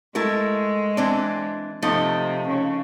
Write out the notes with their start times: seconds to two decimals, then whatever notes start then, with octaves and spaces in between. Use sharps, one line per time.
0.15 G#3 A3 E4 A#4
0.97 E3 C4 D4
1.82 C3 F3 A3 D#4
2.48 C#3